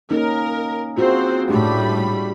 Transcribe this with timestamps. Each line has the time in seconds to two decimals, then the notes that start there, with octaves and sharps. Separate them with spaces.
0.11 A#3 C#4 D#4 A#4
0.98 C4 F4 F#4 G#4 C5
1.49 A2 G3 A3 D4 G4 B5